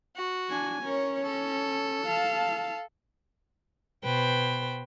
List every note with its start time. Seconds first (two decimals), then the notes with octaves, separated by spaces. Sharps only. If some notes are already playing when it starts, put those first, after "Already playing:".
0.16 F#4
0.50 D4 G#5
0.83 C#4 A#4 C#5
1.23 A4
2.07 F5 A5
4.04 B2 B4 C5 G5